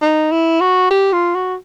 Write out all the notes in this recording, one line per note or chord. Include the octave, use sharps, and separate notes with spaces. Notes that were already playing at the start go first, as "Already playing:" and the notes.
D#4
E4
F#4
G4
F4
F#4